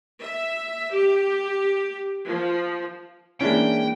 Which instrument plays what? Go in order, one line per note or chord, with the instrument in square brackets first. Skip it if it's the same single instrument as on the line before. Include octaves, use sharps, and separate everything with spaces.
[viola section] E5
G4
F3
[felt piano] E3 G#3 A#3 [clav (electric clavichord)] C#4 D4 E4 [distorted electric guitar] G5